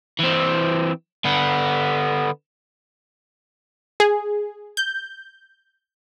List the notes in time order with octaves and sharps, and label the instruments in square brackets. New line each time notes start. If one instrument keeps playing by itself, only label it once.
[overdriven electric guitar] E3 C4
D3 B3
[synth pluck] G#4
G6